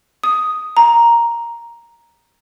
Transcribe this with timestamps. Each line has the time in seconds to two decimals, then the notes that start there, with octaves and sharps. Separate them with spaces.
0.24 D#6
0.77 A#5